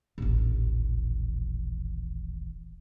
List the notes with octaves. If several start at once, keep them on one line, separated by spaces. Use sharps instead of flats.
D#1 A1